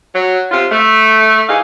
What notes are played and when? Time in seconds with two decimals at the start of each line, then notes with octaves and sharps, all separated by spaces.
0.13 F#3
0.52 C3 F4
0.70 A3
1.48 G#2 E3 D#4 G#4 F5